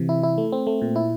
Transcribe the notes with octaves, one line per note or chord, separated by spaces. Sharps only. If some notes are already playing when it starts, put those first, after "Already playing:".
Already playing: C3 E3
E4
E4
A3
C4
A3
A#2
E4